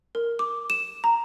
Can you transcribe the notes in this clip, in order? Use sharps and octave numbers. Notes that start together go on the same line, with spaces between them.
A#4
D6
E7
A#5